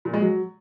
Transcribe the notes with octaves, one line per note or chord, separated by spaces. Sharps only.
A#2
G#3
F#3